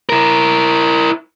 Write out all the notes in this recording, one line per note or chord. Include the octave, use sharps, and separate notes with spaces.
E4 A#4